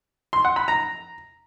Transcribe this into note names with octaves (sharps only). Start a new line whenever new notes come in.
C6
F#5
B5
A#5